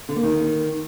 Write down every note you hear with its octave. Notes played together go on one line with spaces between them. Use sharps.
D3
A#3
D#3